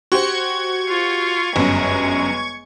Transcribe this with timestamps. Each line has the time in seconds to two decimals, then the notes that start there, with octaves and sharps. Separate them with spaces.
0.12 F#4 G4 C5 C#6 G#6
0.88 F4
1.56 G1 F#2 G#3